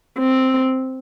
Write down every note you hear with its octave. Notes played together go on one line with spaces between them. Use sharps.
C4